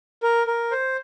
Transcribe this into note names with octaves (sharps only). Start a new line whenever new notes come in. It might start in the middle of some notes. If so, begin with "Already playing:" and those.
A#4
A#4
C5